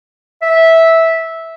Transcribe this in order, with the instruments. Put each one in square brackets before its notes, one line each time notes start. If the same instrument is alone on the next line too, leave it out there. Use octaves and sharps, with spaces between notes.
[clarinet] E5